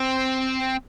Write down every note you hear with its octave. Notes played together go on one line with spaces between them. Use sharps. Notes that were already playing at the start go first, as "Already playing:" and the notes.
Already playing: C4